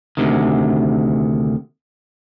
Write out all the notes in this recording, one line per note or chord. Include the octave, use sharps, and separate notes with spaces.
D2 C3 D#3